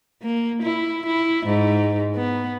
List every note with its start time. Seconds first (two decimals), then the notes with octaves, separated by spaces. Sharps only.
0.23 A#3
0.62 E4
1.06 E4
1.46 G#2
2.16 B3